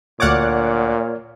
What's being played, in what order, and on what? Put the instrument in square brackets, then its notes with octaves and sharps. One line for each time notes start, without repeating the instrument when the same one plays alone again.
[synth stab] D2 F#5 D6 [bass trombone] A#2 [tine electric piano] C#5 D5 F6